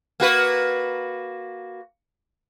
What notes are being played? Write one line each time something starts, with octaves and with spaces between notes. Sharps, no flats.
A#3 F#4 B4